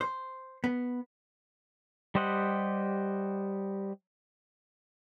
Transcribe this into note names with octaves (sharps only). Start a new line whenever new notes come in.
C5
B3
G3 G4 C5 D#5 F#5